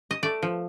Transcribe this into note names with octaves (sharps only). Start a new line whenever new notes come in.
D#5
A3 D5
F3